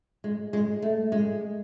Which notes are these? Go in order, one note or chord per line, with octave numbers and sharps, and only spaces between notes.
G#3
G#3
A3
G#3